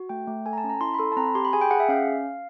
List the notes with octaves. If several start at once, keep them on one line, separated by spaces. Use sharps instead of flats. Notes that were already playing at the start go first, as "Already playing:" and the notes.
Already playing: F#4
A3 G5
A3
A4 G#5
A#5
A5
C#4
A#5
E4 C6
B5
A4 C6
A5
C4 A#5
B5
G4 C6
B5
G#4 G#5
G5
G#4 F#5
E5
C#4 F5